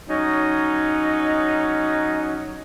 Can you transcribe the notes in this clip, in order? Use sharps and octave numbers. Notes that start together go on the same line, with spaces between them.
F#3 C#4 D#4